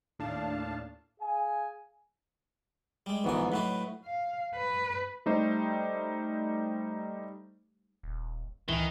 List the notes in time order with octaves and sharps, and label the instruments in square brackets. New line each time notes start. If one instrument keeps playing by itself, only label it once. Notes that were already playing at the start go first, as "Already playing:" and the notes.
[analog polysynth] D#2 A2 D4 F5 A5
[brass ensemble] G#4 F5 G#5
[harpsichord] G3 G#3
[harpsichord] A#1 D3 G#5 [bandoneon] G#2 E3 B3
[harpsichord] A2 F#3 D#4 [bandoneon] B4
[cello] F5
B4
[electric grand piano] G3 A3 D#4 G4 C5
[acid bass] D#1
[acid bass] C#2 [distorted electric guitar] D#3 [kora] E3 [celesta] F7 G7